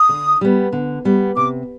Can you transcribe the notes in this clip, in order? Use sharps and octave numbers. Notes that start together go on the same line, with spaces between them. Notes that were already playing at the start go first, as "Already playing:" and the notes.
Already playing: D#6
D3
G3 B3
D3
G3 B3
C3 D6